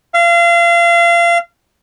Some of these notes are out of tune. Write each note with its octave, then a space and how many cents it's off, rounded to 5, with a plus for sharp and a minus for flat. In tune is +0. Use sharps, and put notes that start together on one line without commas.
F5 -30